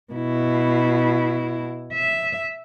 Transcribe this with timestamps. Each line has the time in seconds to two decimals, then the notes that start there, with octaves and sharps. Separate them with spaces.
0.13 B2 E4
1.93 E5